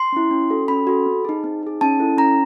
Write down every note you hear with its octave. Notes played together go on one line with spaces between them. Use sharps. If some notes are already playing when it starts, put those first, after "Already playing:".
Already playing: C6
C#4 E4
C#4
F#4 A4
C#4 B5
F#4 A4
C4
D#4 G#4
C4
D#4 G#4
C#4 A5
E4 A4
C#4 A#5